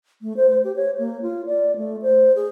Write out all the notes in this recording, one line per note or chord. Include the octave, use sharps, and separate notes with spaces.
A3
C5
C5
G4
C#5
A#3
F4
D5
A3
C5
G#4